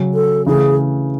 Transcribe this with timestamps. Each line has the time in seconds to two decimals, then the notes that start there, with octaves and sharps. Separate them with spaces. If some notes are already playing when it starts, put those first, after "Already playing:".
Already playing: C#3 F#3 C#4 F#4
0.14 A4
0.46 C#3 E3 A3 G#4